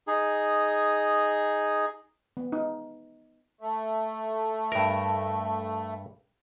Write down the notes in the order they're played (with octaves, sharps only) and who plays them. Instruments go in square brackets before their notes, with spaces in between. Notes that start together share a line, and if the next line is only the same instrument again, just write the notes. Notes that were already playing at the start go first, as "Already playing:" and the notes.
[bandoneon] D#4 G#4
[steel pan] B3
D#4
[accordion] A3
[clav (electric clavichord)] G2 A#4